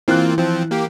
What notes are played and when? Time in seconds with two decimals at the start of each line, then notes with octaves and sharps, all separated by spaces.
0.08 E3 A#3 C4 F4 F#6
0.38 F3 C4
0.71 A#3 G4